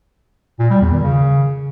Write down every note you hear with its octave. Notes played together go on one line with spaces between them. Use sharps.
A#2
G3
E2
D#3
C#3